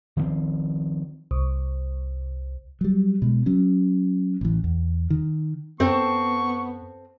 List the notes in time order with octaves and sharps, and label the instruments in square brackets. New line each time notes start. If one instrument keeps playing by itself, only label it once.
[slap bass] D#3 F3 A3 C4
[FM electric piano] C2
[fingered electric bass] F#3 G3
B2 G#3
F#3 C#4
A1 E3
E2
D#3
[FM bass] F#2 [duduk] B3 [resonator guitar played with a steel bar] C4 A4 [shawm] C#6